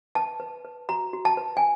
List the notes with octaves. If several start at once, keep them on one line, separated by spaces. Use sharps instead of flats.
B4 A5
B4
B4
F#4 A#5
F#4
A5
B4
G#5